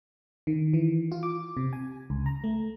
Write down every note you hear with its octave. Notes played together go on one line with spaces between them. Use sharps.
D#3
E3
F4
D6
C3
G#5
C#2
A#5
A3